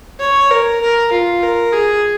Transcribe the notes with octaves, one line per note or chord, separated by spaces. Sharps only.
C#5
A#4
A#4
F4
A#4
G#4